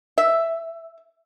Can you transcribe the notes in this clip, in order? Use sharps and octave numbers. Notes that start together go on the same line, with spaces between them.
E5